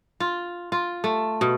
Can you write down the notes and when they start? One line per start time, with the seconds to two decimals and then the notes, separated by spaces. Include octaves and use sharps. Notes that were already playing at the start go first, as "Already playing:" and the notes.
0.20 F4
0.72 F4
1.04 A3
1.41 B2